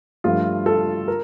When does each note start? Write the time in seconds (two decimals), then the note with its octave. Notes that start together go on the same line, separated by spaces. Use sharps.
0.24 G2 F3 A3 F4
0.66 A4
1.08 A#4